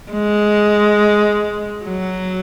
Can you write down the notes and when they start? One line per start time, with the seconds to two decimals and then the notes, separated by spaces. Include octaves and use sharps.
0.12 G#3
1.85 F#3